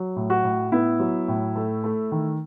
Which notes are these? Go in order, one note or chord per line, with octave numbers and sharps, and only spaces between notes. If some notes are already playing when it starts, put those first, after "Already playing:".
Already playing: F#3
A2
F#4
A2
B3 E4
F#3
A2
A3
A3
D#3